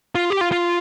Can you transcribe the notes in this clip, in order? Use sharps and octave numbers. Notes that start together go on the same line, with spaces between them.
F4
G4
F4
F4